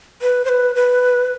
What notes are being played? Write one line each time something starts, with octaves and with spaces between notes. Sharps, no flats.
B4
C5
B4
B4